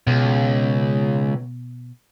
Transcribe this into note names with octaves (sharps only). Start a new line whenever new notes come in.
C#2 B2